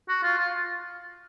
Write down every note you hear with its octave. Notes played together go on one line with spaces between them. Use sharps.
F#4
F4
F4